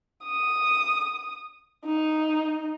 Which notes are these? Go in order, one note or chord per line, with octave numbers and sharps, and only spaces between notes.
D#6
D#4